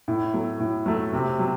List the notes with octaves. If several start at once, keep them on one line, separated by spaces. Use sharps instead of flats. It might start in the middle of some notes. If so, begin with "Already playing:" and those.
A2
F#3 A3
A2
F#3 A3
C3
F#3